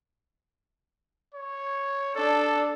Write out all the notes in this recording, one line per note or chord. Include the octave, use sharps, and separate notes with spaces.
C#5
D4 A4